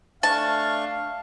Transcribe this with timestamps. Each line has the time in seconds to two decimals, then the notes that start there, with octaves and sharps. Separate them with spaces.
0.23 A3 D4 F5 A5 C#6